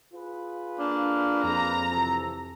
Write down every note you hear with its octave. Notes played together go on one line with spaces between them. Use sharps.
F4 G#4 B4
A#3 D4
F2 A#5
C3 E3 A4